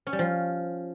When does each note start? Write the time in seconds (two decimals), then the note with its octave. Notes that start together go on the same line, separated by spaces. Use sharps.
0.07 C#4
0.13 G3
0.19 F3